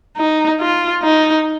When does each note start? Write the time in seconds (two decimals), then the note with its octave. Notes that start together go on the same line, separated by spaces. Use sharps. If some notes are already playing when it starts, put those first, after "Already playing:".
0.17 D#4
0.61 F4
1.03 D#4